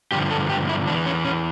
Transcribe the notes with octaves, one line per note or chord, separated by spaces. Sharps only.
G2 D3 F3 G4
A4
G4
E4
E2 E3 D4
C#4
C#4